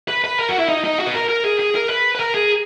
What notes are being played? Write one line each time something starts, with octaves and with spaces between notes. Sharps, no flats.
B4
B4
A#4
F#4
E4
D#4
D#4
F#4
B4
A#4
A#4
G#4
G#4
A#4
B4
B4
A#4
G#4